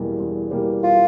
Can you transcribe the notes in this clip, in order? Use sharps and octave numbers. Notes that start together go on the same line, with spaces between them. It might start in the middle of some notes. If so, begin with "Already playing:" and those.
Already playing: E2 B2 G3 A#3
E2
B2 G3 A#3
F4